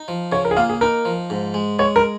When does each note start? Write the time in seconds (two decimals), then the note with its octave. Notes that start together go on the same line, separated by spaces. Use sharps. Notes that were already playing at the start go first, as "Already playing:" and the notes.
Already playing: D#4
0.08 F3
0.32 C#3 C#5
0.45 A#4
0.51 G#4
0.57 A#3 F4
0.69 G#4
0.81 D#4 A#4
1.05 F3
1.30 G#2
1.54 G#3
1.79 G#3 C#5
1.96 A#4